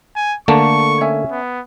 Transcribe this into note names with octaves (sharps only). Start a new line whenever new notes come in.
G#5
D3 A3 A#3 A5 C#6
C#4 E5 G#5
B3